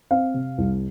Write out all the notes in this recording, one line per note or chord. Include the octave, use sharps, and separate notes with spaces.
C4 F5
C3
C2